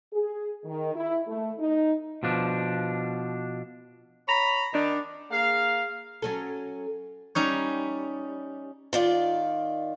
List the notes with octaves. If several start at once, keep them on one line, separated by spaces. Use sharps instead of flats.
G#4
D#3
E4
A3
D#4
B2 F3 D4
C#5 A#5 B5
D#3 D4
A#3 G#4 F5
F#3 C#4 A4
G3 C#4 D#4 C#5
D#3 F4 D5